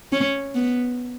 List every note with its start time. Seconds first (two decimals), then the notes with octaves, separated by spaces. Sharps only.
0.12 C#4
0.55 B3